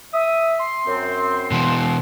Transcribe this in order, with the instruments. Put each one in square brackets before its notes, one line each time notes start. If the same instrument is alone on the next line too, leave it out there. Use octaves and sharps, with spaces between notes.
[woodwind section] E5 [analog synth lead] D#6
[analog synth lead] C6
[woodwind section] F#2 C4
[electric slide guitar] B2 E3